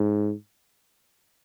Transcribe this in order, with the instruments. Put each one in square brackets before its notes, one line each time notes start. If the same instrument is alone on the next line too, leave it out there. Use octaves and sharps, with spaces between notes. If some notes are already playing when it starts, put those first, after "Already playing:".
Already playing: [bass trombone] G#2